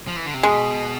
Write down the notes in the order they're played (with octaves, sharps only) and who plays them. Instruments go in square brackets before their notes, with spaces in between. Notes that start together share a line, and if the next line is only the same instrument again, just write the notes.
[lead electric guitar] F3
E3
D3
C3
[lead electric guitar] B2 [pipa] G#3